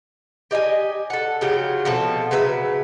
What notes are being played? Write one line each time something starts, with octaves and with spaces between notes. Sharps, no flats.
G4 D#5 F5 G#5
A4 F#5
C#3 F3 F#3 G4
B2 F3 C4 A4
C#3 F#3 B4 E5